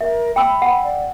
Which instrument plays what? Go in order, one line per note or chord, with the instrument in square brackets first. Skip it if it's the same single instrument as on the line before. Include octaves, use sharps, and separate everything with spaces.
[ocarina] A#4 [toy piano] E5
[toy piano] G5 E6 [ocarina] B5
[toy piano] F#5
[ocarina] D5